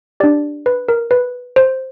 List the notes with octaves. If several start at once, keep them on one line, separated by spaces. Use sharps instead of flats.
D4 G4 D5
B4
A#4
B4
C5